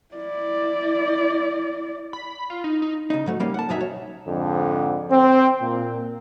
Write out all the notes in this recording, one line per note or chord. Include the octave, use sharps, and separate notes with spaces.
E4 D5
B5
F4
D#4
D#4
C#3 D#4
G#2 F#3 A3
G3 A#3 C#4
F#5 A5
B1 G2 F#3 D#4 E5 G#5
C#5
F2 G#2 D3
C4
A#2